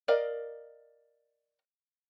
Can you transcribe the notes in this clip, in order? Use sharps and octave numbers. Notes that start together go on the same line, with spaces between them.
A#4 D5 D#5 F5